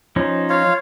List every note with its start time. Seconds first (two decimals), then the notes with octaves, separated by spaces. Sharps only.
0.16 F3 C#4 D#4
0.50 F4 C#5 F5